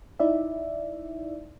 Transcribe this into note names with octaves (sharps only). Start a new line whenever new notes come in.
D#4 E4 D5 E5